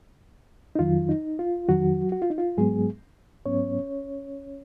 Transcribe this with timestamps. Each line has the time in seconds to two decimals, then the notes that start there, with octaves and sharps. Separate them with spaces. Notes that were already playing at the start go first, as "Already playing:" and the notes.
0.75 D#4
0.79 F2 D#3 F#3 F4
1.09 D#4
1.39 F4
1.69 F2 D#3 F#3 F#4
2.12 F#4
2.22 F4
2.30 D#4
2.38 F4
2.57 G#2 F#3 G#3 B3 G#4
3.46 G#2 F#3 B3 C#4 C#5